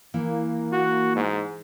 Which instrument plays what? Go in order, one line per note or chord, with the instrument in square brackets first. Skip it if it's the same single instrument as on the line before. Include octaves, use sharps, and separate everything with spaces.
[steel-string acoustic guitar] E3 [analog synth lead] A#3
[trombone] F#4
G#2